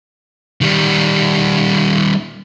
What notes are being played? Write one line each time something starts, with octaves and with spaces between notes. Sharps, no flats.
D#3 G3